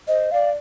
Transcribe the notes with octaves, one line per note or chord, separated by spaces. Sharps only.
C5 D#5
D5 F5